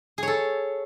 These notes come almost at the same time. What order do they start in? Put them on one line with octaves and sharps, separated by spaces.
G#4 C#5 A4